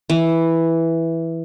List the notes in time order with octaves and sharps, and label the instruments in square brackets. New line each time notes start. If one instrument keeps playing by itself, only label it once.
[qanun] E3